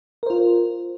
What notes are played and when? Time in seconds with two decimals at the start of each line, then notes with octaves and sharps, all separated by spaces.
0.23 A#4
0.26 C5
0.30 F4